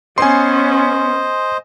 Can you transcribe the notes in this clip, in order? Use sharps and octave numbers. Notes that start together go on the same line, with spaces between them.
B3 C#4 C5 D#5 G#5 C6